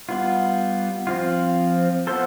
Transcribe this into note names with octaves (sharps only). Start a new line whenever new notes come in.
G3 B3 F4
F3 C4 F4
B3 F4 A4 C5